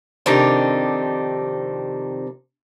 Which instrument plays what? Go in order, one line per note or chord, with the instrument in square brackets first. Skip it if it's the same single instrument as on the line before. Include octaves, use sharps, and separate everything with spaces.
[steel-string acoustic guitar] F2 C3 D#3 C4 D4 D#4